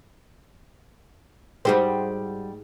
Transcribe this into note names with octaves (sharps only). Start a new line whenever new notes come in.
G#2 G3 G#3 F#4 G4 C5